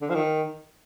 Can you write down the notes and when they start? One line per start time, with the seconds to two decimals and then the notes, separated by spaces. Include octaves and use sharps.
0.01 D3
0.10 F3
0.15 D#3